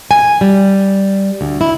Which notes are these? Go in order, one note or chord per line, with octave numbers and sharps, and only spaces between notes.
G#5
G3
D2
E4